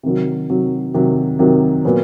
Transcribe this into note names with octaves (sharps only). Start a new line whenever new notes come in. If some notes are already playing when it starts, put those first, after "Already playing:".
C3 D#3 F#3
C3 D#3 F#3
C3 D#3 F#3
C3 D#3 F#3
A#2 F#3 B3